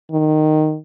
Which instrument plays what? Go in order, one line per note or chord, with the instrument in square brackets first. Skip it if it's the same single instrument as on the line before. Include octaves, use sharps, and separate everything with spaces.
[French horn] D#3